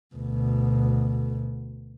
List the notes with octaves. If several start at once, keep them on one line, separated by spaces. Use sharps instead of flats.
D2 B2